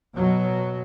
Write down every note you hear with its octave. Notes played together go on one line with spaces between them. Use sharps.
B2 F#3